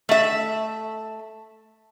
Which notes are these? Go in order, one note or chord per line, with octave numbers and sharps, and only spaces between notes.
A3 E5